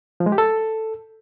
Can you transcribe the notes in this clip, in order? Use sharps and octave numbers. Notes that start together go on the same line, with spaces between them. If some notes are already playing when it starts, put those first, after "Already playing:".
F3
G#3
G4
A4